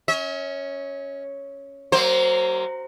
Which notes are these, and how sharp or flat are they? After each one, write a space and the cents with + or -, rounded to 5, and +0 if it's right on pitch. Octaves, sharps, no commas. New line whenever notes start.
C#4 +0 E5 -45
F#3 +30 A#3 -15 C5 +0